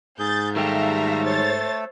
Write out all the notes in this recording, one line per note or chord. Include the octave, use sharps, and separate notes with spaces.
G#2 G#4 G6 A6
D#3 G3 A3 G4 A4 E5 F5 A#5
C5 C#5 A6